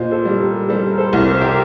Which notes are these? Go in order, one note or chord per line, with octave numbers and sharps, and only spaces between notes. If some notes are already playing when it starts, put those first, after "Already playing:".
Already playing: A#2 C5 D#5
A4 C5
G3
G4 A#4
G3 A4 C5
A#4
A4 C5
C2
A#4
C5
G4 A#4